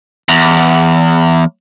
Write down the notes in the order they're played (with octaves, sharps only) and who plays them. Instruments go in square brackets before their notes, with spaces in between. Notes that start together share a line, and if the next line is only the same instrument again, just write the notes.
[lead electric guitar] E2